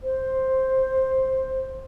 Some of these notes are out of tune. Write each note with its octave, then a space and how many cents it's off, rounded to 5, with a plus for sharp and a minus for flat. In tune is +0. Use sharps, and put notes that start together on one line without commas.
C5 +5